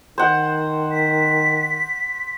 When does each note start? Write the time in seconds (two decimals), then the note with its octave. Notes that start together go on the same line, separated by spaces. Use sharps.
0.18 D#3 C5 F#5
0.92 B6